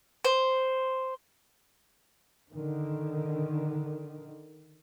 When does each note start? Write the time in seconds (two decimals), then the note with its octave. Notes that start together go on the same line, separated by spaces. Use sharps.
0.25 C5
2.53 D3 D#3